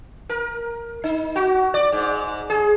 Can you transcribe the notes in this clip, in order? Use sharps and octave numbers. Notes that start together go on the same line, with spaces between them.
A#4
D#4
F#4
D5
G#2
G#4